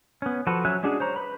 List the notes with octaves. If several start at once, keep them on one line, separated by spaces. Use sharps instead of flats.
B3 C#4
F3 F#4 A4 B4
F#3 C#4 E5 G#5 F#6
G#3 C#4 D4 F#4 G#4
C5 C#5 A#5
B4 B5